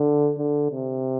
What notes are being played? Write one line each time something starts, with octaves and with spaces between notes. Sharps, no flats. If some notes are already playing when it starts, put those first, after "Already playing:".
Already playing: D3
D3
C3